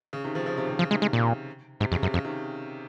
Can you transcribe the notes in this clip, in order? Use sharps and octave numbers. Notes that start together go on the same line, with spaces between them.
C#3
C3 D#3
C#3 F3
C#3 F3
C3 D#3
C3
C#3 F3
C3 D#3 G#3
G#3
A#2
G#2 C3
F2 C#3
F#2 C3
F2 C#3
C3 D#3